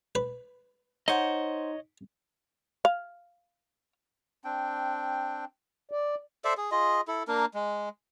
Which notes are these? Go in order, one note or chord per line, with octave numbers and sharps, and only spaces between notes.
B4
D#4 C5 C#5 D#5 F#5
F5
C4 D4 G5
D5
A4 C5 D5 E5
G#4
F4 G#4 D#5
E4 A4
A#3 D4 A#4
G#3